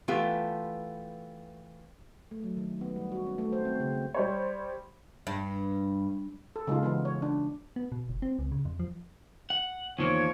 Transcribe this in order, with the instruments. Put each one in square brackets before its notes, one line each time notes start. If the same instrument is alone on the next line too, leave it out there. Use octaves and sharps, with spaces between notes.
[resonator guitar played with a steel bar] E3 A3 B3 F4 G4
[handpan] A3
F#3
D#3
B3
G3
F#4
C#4
A3
C5
C4
C#3
C#4
[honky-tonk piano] G3 C5 C#5
[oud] G2
[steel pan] A4
C#3 G#3 D#4 F4
E3 G#3 B3
C#5
D4
[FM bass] B3
B2
F#1
C4
C#2
C#3
F2
F3
[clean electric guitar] F#5
[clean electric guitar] E2 D#3 A#3 [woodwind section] F3 A#4 C#5